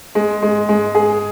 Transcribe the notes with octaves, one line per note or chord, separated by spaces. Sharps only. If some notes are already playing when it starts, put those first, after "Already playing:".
G#3
G#3
G#3
G#4